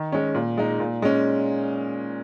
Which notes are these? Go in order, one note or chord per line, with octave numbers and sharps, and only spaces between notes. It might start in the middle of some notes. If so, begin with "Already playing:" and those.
Already playing: D#3
G#3 C#4
A#2
G#3 D#4
A#2
G#3 C#4